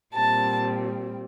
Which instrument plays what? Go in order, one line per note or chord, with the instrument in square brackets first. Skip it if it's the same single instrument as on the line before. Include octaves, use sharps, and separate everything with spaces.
[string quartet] A#2 G3 C4 A5